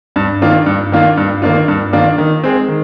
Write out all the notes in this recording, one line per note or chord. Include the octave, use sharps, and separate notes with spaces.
G2
D#3 A#3 D4 F4
G2
D#3 A#3 D4 F4
G2
D#3 A#3 D4 F4
G2
D#3 A#3 D4 F4
D#3
G#3 C4
D#3